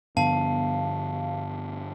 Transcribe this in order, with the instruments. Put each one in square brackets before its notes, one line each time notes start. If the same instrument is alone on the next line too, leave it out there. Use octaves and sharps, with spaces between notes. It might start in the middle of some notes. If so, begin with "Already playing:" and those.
[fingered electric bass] G2 D3 F3 [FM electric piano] B3 [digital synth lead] F5 [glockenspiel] A5